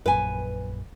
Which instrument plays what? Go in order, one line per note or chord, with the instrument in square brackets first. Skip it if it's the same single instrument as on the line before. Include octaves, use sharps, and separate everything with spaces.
[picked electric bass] A#1 F#2 [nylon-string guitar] B4 G#5